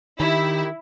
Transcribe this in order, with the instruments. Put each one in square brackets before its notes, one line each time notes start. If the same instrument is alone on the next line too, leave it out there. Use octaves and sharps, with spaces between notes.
[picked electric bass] D#3 [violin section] E4 [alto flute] G4